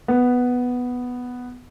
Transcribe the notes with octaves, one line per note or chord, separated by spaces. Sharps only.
B3